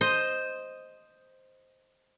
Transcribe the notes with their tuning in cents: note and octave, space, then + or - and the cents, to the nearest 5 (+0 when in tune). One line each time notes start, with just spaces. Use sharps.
C5 +0 D#5 +0